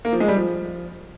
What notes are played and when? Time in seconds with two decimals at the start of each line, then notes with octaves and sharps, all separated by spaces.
0.05 A#3
0.13 F3
0.20 G#3
0.28 G3
0.36 F3